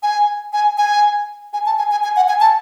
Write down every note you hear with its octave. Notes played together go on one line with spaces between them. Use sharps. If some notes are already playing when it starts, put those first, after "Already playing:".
G#5
G#5
G#5
G#5
A5
G#5
G#5
G#5
F#5
G#5
A5